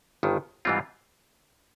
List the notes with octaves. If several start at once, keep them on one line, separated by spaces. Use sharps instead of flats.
G1 G2 D#3
G#2 E3 G3 C4 F4